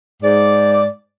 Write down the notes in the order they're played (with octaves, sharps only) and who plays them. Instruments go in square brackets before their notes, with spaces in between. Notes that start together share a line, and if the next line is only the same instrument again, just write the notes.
[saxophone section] G#2 D5